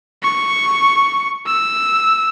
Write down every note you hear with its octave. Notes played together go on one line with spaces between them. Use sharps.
C#6
E6